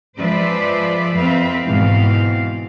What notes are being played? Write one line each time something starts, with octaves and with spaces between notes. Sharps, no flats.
F3 G#3 B4 C5 D5 E5
F2 C4 B4 E5 F5
G#2 B2 E3 C4 F5